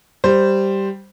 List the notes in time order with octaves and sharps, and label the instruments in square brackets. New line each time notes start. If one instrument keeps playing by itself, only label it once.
[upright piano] G3 C5